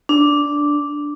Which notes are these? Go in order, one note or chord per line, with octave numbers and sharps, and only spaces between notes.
D4